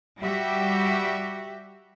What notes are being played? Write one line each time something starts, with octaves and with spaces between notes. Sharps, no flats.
G3 F#4 G4 E5